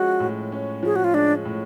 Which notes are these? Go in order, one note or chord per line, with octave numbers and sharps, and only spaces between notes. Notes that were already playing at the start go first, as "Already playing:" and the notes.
Already playing: F3 G#3 C#4 F#4
A2
C#4
F3 G#4
F#4
F4
G#3 D4
A2